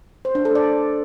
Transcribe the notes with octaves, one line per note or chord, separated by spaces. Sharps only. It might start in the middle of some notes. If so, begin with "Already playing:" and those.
C5
D4
A4
D5